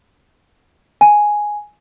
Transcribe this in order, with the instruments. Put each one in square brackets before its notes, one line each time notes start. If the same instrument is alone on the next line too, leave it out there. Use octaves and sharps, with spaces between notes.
[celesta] G#5